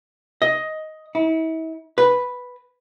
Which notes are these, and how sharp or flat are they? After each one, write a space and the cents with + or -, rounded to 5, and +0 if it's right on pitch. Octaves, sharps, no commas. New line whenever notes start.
D#5 +10
E4 -40
B4 +0